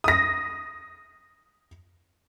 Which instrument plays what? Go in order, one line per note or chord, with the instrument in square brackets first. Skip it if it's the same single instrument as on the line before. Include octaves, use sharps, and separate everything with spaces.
[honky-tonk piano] D#6 A#6